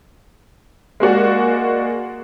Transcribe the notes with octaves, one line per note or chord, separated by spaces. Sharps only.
G#3 A#3 F#4 D5